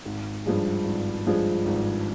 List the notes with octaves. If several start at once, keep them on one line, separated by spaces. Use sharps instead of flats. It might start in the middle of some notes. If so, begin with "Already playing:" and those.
G#1
G2 F3 G#3
G#1
G2 F3 G#3
G#1